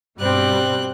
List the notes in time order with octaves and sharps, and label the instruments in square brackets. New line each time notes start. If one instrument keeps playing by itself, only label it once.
[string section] G2 B2 G3 [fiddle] C4 F#6